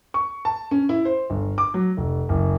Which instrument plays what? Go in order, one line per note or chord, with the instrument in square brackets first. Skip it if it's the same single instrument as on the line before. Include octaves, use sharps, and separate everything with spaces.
[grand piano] C#6
A5
C#4
E4
C5
G1
D6
F#3
F1
F#1